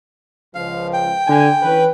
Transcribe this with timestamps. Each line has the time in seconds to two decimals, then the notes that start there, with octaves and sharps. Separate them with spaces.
0.55 C#2 F3 F5
0.93 G5
1.28 D3 G#5
1.63 E3 C#4 B4